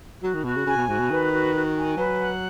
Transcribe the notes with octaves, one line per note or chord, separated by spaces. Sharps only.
F#3 F#4
D#3
B2 F#4
C#3
C#3 G#5
B2
G#2 F#4
B2
D#3 B4
F#4
F#4
G#5
F#3 B4
F#5